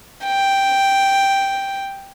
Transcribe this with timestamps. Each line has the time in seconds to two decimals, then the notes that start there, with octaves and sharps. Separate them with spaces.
0.26 G5